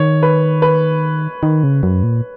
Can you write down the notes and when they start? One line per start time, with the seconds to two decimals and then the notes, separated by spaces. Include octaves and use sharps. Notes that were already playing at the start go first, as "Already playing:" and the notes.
Already playing: D#3 C#5
0.23 B4
0.62 B4
1.43 D#3
1.63 C#3
1.83 F#2
2.03 A#2